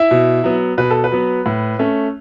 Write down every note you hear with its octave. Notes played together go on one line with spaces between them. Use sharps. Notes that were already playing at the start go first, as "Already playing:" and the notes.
Already playing: E4 E5
B2
F#3 B3
B2 B4
A4
B4
F#3 B3
A2
A3 C#4